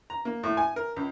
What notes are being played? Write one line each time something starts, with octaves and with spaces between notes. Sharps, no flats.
A#5
A#3
A2
G#5
A#4
C#2